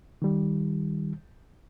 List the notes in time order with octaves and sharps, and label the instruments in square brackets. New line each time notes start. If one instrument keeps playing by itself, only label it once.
[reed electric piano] D#3 G3